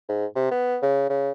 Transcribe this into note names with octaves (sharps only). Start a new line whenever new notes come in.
G#2
C3
B3
C#3
C#3